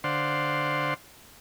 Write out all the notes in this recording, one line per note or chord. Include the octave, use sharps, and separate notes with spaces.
D3 C5 D5 F5 F#5 C6